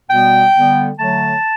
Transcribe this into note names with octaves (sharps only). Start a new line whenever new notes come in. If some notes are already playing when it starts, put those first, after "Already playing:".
B2 G3 B3 G5
D3 G3 B3
D3 F#3 A3 A5